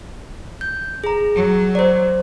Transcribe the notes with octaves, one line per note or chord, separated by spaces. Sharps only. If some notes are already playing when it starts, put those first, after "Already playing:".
G6
G#4 A#5
F#3
C5 D5